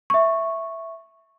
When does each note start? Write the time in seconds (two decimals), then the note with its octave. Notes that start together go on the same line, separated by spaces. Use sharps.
0.10 E5 C#6